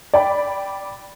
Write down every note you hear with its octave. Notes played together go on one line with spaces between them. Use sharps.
D5 G5 B5